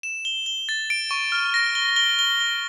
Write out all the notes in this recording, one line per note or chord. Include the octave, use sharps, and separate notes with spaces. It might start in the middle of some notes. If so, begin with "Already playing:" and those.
E7
G7
G7
A6
D7
C#6
F6
A#6
G7
G7
G7
G7